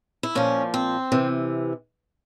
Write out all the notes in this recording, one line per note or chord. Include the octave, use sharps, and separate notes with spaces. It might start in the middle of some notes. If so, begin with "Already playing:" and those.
E4
A#2 F3 C#4
C4
C3 E3